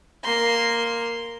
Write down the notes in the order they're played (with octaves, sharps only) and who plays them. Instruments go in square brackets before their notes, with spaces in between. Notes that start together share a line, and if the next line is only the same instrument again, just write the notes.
[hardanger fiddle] A#3 C6